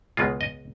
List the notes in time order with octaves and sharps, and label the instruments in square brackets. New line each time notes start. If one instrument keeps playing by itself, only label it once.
[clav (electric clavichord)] C#2 B2 G#3 F4
D#5